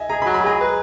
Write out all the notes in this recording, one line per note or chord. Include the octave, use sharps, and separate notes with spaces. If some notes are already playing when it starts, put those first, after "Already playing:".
Already playing: D#5 E5 G#5
G#4 A#5
B5
F#3
B5
G#4 A#5
B4